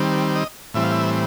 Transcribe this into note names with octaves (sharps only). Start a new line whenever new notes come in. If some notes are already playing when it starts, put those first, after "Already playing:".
Already playing: D#3 G3 C4
D#5
A2 E3 G3 C4 E5
F5
E5